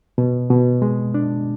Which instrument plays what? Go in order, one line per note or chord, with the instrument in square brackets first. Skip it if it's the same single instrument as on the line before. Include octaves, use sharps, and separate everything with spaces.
[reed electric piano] B2
B2
G#3
D4